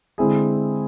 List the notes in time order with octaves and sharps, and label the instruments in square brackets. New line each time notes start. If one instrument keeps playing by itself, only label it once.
[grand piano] D3 G#3 C4 E4 G#4